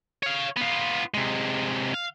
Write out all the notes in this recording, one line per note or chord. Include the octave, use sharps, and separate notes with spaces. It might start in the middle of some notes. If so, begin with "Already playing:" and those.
C#5 F5
B3 F4
C3 G#3
F5